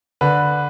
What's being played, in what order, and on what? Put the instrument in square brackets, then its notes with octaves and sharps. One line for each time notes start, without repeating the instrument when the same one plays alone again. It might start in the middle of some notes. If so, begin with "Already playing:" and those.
[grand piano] D3 B4